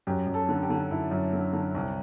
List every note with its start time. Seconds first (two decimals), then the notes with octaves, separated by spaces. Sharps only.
0.07 F#2 G4
0.27 F#2
0.34 A4
0.49 D3
0.62 G4
0.70 D3
0.90 F#2 E4
1.11 F#2
1.33 D3
1.53 D3
1.75 C2